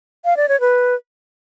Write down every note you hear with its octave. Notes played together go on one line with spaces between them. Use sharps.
F5
D5
C#5
B4